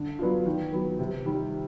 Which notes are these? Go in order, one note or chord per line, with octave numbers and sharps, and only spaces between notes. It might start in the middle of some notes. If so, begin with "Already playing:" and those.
Already playing: D3
F#3 B3 D4 F4
D#3
F#3 B3
C3
D#3 G3